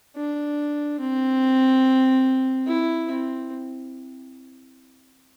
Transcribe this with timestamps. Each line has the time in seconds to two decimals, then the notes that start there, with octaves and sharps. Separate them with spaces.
0.16 D4
1.00 C4
2.67 E4
3.08 C4